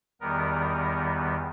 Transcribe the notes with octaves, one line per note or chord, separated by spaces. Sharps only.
E2 D#3 G3 B3 A#4